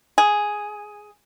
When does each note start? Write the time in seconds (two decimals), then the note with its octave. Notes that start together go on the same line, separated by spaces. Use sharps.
0.18 G#4